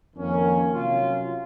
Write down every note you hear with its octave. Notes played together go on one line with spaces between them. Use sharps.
F2 D#3 A#3 C#4
C3 F#3 C#4 F4